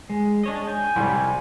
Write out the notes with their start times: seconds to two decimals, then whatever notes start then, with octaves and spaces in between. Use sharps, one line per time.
0.09 G#3
0.44 D4 C#5 D#5
0.67 G5 G#5
0.96 C2 G3